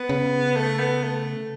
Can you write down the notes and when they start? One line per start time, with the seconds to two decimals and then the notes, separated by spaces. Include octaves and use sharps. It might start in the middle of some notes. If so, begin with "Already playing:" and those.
Already playing: B3
0.09 C#3
0.56 A3
0.79 B3
1.03 A3